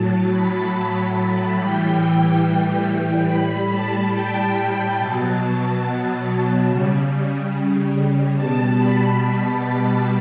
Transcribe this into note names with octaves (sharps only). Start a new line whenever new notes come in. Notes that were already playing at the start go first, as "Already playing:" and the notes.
Already playing: A2 F#3 A5
B5
A5
A2 E3 G3 G5
A2 G3 B5
A5
G5
B2 F#3 A5
C#3
G3
B2 G3 A5
B5
A5